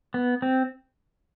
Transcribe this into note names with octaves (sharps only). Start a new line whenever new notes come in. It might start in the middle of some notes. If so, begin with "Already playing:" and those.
B3
C4